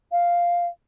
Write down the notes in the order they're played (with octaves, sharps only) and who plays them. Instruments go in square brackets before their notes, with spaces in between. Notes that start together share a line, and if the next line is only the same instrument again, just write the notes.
[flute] F5